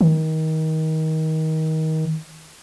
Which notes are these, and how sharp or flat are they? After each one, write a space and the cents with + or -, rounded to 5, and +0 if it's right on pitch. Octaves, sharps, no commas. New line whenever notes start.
D#3 +25